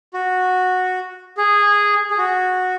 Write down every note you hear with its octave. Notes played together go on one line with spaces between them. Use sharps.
F#4
G#4
G#4
F#4